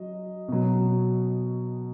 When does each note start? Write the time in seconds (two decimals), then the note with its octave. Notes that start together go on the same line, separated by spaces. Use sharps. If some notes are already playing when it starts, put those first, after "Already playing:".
Already playing: F#3 D#5
0.48 B2 F#3